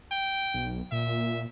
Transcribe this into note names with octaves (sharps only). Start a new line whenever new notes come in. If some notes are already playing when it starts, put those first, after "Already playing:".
G5
B1
A#2 E5